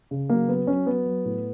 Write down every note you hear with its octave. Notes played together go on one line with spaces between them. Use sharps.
C#3
F#3 A#3
F#3 B3
F#3 C#4
F#3 B3
F#3
A2